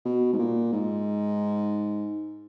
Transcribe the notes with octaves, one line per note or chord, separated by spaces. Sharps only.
B2
G#2
A#2
G#2